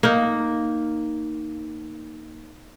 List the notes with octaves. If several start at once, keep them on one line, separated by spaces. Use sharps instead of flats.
A#3 D#4